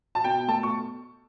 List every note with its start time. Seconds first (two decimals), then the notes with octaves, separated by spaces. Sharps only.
0.15 A5
0.24 B2 G5
0.48 A3 A5
0.63 C#6